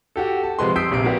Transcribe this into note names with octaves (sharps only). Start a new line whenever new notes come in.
F#4 G4 A4
A5
C3 F3 G#3 B4 C6
D#6 E6 G6 B6 C7 D7
A#1 C3 C7 D7
A#3 B3 F#4 G4 A#4